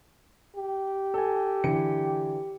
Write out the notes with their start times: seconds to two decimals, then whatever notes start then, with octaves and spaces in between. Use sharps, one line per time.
0.56 G4
1.14 A4 G#5
1.64 D3 E3 C#7